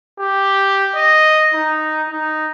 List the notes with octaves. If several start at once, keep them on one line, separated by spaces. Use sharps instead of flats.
G4
D#5
D#4
D#4